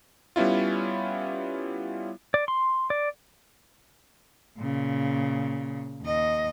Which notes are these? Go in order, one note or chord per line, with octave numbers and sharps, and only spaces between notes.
G3 B3 C#4 E4 F4
D5
C6
D5
A#2 C#3
D#2 D#5